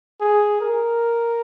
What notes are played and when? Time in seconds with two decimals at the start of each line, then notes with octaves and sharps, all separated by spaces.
0.21 G#4
0.60 A#4